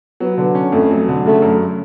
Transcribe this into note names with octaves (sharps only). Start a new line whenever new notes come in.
F#3 B3
D3
C#4
F2 A3
F#3
D3
C#3 A3
F#2